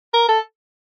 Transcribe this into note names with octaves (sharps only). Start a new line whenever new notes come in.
A#4
A4